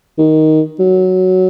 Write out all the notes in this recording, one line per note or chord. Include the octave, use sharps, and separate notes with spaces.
D#3
F#3